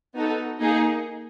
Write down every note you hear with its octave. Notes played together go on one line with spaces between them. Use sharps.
B3 D#4 F#4 A4
A#3 D#4 G#4